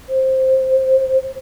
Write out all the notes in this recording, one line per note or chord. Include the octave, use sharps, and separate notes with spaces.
C5